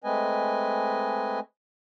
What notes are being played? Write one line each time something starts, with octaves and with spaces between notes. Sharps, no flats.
G#3 A3 C4 B4 D#5 G#5